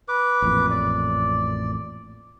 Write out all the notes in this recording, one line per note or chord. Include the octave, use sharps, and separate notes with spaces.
B4 D6
A1 F2 A#2
D5